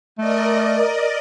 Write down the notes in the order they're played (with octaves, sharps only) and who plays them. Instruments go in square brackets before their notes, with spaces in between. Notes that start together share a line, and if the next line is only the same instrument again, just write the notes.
[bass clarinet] A3 [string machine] A#4 D5 D#5